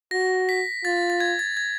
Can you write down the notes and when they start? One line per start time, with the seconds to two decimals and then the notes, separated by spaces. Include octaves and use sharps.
0.11 F#4 A#6
0.49 B6
0.84 F4 A6
1.10 A6
1.20 G#6
1.39 A6
1.57 G#6